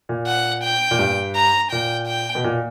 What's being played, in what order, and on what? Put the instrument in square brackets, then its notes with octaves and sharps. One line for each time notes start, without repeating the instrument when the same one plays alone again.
[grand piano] A#2
[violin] F#5
G5
[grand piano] A#2
G2
[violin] A#5
[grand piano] A#2 [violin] G5
[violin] G5
[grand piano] B2
A#2